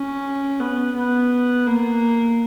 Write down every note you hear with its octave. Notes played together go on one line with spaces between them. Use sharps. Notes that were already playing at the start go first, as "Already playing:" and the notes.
Already playing: C#4
B3
B3
A#3